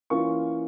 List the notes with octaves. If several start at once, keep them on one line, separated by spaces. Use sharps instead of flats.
E3 A#3 C#4 F4 C#6